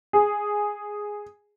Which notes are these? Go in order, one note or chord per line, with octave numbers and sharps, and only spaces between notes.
G#4